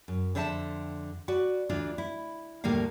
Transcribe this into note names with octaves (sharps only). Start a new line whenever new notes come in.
F#2
F2 D3 C5 E5 G5 A5
F#4 B4 D5
D2 E3 D4 F4
E4
D#2 A2 D3 G3 A#3 F5